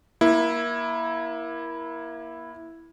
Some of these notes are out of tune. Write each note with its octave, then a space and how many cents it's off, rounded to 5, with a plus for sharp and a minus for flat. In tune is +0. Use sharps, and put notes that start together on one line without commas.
A#3 +25 E4 +0